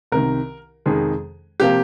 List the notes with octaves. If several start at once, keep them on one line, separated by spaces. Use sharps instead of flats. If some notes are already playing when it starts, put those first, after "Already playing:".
C2 C3 D#3 A#4
F2 C3 D#3 G#3
C3 F3 A#3 G4